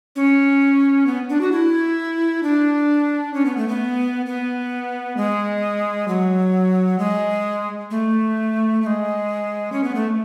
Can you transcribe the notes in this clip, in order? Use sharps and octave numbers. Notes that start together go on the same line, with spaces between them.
C#4
B3
D4
F#4
E4
D4
C#4
B3
A3
B3
B3
G#3
F#3
G#3
A3
A3
G#3
C#4
B3
A3